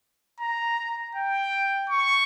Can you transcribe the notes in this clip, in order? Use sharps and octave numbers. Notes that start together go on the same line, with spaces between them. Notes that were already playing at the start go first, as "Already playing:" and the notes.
A#5
G5
C#6